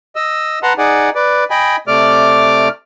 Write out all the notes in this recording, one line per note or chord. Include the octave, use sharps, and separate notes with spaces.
D#5 E6
B4 F#5 A5 A#5 C6
D#4 G#4 D5 F#5 G#5
B4 D5
D#5 G5 G#5 B5
C3 A3 D5 D6 F6